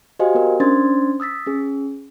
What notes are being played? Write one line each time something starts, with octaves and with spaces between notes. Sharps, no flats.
F#4 G4 C5 D#5 F5 G#5
B3 A#4
C#4 D4 C5 C6 G#6 A6
D#6 E6 A6 B6
C#4 G#4